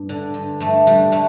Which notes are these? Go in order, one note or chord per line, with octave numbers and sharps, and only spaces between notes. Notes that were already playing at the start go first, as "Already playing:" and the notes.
Already playing: G2
D3
G2
G2 A3
D3 G3
D3 A3